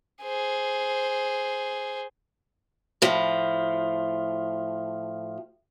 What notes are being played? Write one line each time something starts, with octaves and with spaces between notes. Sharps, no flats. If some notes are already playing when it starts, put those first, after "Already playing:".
G#4 C5
A2 F3